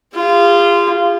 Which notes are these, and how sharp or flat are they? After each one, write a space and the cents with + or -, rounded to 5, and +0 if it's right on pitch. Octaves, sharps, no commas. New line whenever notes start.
F4 -20 G#4 -45